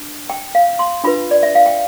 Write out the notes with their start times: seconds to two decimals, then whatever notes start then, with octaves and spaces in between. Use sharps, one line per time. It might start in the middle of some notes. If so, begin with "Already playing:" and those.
Already playing: D4
0.30 G5
0.55 F5
0.79 C6
1.04 D4 F4 B4 B5
1.31 D5
1.43 E5
1.55 F5
1.66 G5